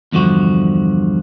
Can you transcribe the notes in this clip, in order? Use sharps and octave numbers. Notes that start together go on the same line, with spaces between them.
E2 G2 D3 F3 F#4